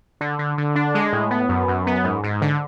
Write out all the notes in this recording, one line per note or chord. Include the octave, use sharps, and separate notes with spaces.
D3
D3
D3
D4
G#3
A2
B3
F#2
F#2
B3
G#2
G#2
D3